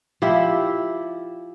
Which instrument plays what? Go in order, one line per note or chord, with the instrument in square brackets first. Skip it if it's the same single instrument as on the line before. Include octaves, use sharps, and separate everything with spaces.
[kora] F3 E4 G4 E5